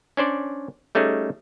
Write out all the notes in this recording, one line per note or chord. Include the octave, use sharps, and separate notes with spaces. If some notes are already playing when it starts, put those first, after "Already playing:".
C#4 D4 C5 D5
G3 A3 C#4 D#4 G#4